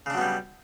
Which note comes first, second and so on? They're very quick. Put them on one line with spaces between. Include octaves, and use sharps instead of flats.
C#3 D4 F#3 B3 G3